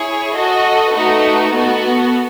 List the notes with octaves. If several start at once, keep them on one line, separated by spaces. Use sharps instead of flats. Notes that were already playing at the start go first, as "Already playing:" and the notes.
Already playing: E4 G#4 C#5
F#4 A4 D#5
A3 D#4 F#4 B4
B3 F#4 A4